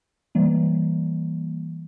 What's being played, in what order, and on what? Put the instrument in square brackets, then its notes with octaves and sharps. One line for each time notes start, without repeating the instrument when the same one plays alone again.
[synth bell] E3 G3 A#3